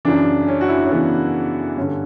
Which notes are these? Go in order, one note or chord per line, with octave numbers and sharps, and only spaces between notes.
F#2 C#3 E3 D4
C#4
F#4
E4
D4
C#4
F#2 C#3 E3 B3
G2 D3 C#4